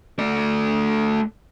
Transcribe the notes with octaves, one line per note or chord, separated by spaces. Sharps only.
A3 D5